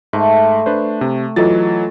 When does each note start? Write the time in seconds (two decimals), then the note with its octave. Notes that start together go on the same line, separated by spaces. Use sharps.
0.13 G#2 A3
0.66 D4 B4 C5
1.01 C3
1.36 E3 F#3 F4 A4 D#5 A6